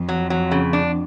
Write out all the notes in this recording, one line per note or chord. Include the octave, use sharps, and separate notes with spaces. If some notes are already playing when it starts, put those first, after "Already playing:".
Already playing: F2
F#3
F#3
C#3
D4